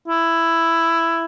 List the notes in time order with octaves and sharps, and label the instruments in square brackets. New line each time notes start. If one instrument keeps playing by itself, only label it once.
[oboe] E4